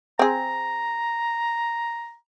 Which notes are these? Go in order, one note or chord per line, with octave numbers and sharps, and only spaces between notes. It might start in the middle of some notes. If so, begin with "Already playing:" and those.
C4 G#4 A#5